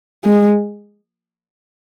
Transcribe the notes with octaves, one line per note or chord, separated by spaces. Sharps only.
G#3